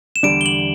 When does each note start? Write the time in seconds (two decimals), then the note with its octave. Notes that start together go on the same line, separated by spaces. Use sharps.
0.16 E7
0.23 E2 D3 G3 D4 D7
0.41 G7
0.46 F#7